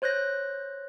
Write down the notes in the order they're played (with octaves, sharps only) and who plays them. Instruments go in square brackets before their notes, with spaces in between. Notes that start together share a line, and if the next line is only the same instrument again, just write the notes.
[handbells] C5 C#5 F#6 G6 A#6